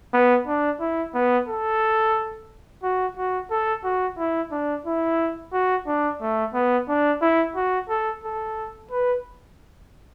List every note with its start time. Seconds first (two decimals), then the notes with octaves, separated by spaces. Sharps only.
0.13 B3
0.47 D4
0.80 E4
1.14 B3
1.48 A4
2.83 F#4
3.17 F#4
3.51 A4
3.84 F#4
4.18 E4
4.51 D4
4.86 E4
5.53 F#4
5.87 D4
6.21 A3
6.54 B3
6.89 D4
7.22 E4
7.56 F#4
7.89 A4
8.23 A4
8.91 B4